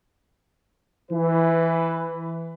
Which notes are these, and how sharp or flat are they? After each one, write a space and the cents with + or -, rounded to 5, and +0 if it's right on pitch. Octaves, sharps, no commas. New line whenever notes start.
E3 +0 B4 +20